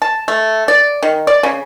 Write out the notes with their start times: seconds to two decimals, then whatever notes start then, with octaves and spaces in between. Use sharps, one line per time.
0.02 A5
0.28 A3
0.68 D5
1.03 D#3
1.27 D5
1.43 C#3